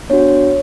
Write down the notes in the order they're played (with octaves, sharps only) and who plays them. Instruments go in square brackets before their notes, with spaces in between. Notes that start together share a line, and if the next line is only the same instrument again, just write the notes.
[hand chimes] B3 D4 F#4 C#5